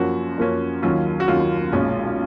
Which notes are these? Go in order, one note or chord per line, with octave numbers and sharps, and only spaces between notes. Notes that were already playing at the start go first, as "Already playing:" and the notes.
Already playing: F#2 F3 A#3 C#4 F#4
F#2 F3 A#3 C#4
D#2 D#3 F#3 C#4 F4
F#4
D#2 D#3 F#3 C#4 F4
B1 A#2 G#3 C#4